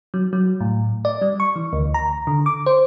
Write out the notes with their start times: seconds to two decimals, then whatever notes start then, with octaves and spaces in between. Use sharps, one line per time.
0.14 F#3
0.33 F#3
0.61 A2
1.05 D5
1.22 G3
1.40 C#6
1.56 E3
1.73 D2
1.94 A#5
2.27 D3
2.46 D6
2.66 C5